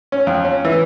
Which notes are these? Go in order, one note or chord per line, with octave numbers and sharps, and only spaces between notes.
C#4
F2
C#4
E3